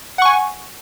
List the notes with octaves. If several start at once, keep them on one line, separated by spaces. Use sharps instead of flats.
F#5 G#5 C#6